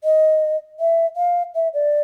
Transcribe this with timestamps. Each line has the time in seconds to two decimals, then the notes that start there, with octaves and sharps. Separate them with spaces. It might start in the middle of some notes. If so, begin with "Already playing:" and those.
0.04 D#5
0.80 E5
1.16 F5
1.55 E5
1.74 D5